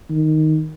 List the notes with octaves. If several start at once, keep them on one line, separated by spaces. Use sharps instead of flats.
D#3